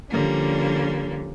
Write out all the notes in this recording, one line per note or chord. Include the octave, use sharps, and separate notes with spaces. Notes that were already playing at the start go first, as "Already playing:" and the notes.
D3 F3 G3 A#3 C#4